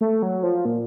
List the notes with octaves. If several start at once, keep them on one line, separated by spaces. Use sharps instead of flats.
A3
F#3
F3
A#2